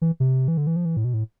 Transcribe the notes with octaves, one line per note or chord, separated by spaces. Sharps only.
E3
C3
E3
D3
E3
F3
E3
A2
B2
A2